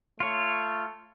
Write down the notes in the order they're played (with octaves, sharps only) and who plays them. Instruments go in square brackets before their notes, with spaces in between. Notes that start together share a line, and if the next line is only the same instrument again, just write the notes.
[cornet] A3 [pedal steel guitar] F4 C#5